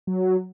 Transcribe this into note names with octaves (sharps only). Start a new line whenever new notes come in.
F#3